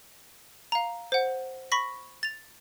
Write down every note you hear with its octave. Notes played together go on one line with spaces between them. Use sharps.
F5 A#5
C5 F#5
B5 C#6 A#6 B6
A6 F7